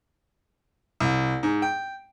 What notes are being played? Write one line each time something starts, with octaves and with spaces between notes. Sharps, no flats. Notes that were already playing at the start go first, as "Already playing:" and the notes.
C2
G#2
G5